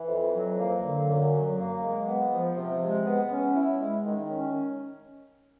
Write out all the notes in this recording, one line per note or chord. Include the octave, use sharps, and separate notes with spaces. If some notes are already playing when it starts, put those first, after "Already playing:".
Already playing: E3
F2
F#3
A#3
D3
F#2
F#3
A#3
G#3
B3
F3
C3
G#3
B3
C#4
E4
G#3
D#3
C#4